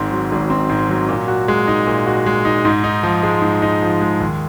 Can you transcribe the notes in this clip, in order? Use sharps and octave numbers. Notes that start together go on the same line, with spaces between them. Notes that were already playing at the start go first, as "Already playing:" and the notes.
Already playing: G#1 G#2 C4
F#3
G#1
C4
G#2
F#3
A#2
F#4
G#3
D#4
A#2
F#4
G#3
D#4
G#2
D#4
F3
G#3
G#2
D#4
F3
G#3
D#2